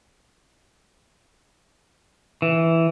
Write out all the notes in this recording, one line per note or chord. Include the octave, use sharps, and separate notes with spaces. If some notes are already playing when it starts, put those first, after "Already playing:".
E3